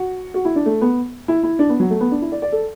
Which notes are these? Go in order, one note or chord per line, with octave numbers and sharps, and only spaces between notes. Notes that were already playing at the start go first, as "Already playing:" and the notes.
Already playing: F#4
F#4
E4
D4
A3
B3
E4
E4
D4
B3
F#3
A3
B3
D4
E4
D5
D5
A4